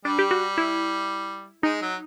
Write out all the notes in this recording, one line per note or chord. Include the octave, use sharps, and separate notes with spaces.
G3 D4
G4
F#4
E4
G#3 D#4
F#3